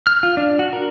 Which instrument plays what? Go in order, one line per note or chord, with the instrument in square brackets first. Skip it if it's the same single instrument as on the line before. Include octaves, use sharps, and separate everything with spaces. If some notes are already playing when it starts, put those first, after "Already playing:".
[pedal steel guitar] F6
F4
D4
F#4
A#4